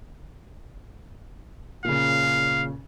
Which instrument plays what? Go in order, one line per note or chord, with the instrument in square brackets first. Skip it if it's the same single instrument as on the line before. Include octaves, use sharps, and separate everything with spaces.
[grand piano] A#2 C#3 [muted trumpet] F5